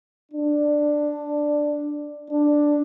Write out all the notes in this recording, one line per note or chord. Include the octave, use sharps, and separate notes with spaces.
D4
D4